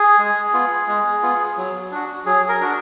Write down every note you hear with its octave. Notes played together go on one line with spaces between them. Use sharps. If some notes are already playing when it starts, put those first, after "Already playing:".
Already playing: G#4
G#3
B3 F4
G#3
B3 F4
F#3
D4 F#4
F#3 G#4
A#4
D4 F#4